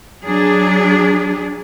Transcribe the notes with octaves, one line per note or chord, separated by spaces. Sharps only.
F#3 D4 G#4